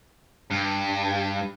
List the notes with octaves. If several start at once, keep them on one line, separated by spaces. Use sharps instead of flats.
G2